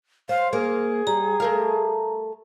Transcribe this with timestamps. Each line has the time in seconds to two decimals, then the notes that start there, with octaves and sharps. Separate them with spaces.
0.29 C5 F5
0.53 A#3 G#4
1.07 G3 A#5
1.40 A3 A#4 F5